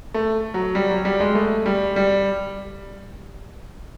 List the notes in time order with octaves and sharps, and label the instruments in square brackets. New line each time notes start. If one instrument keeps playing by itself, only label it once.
[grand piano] A3
F#3
G3
F#3
G3
G#3
A3
G3
G3